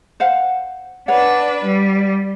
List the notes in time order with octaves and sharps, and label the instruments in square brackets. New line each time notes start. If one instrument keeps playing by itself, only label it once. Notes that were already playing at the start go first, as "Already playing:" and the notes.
[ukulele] C5 F5 F#5
[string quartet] D4 B4 [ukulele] C#5 F#5
[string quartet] G3